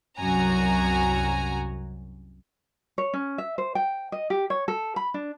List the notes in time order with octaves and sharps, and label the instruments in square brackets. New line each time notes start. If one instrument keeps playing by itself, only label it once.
[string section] C2 F#2 F#4 G#5 A#5
[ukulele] C#5
C#4
E5
C5
G5
D#5
G4
C#5
A4
B5
D4